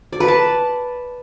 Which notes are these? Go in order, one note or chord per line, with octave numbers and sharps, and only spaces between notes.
D5
B4
A5